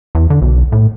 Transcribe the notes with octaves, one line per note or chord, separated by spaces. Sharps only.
E2
D3
B1
A2